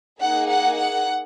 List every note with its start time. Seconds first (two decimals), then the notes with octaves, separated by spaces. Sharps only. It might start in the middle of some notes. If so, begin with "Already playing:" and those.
0.21 A#3 D#4 G#4 F#5
0.50 F#5
0.77 F#5